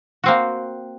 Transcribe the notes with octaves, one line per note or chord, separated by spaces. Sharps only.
A#3 C4 F#4